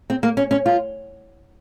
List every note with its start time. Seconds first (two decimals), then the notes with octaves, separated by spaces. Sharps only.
0.10 C4
0.23 A#3
0.37 C#4
0.51 C#4
0.66 F4